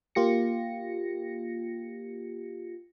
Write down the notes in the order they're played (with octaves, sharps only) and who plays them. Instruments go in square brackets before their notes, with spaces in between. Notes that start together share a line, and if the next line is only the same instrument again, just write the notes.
[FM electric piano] A#3 F4 G4 A#6 C#7